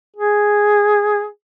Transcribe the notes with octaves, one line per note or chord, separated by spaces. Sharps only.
G#4